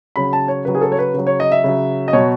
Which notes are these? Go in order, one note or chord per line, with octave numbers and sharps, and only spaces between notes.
C#3 F#3 B5
A5
C#5
C#3 F#3 B4
G#4
A4
C#5
B4
C#3 F#3
C#5
D#5
E5
C#3 F#3
D#5
B2 F#3 C#5